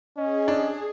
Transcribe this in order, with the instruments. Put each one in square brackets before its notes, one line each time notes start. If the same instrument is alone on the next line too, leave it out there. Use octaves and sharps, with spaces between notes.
[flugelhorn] C#4 [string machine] G#4 [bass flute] D#5
[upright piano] D4